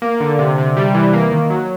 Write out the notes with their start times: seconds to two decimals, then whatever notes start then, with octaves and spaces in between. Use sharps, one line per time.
0.02 A#3
0.20 D3
0.39 C3
0.58 C3
0.77 G3
0.94 E3
1.13 A#3
1.31 D#3
1.50 F#3